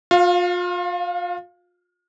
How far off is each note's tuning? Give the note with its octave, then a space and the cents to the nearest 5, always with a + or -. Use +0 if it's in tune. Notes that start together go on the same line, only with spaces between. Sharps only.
F4 +35 F5 +0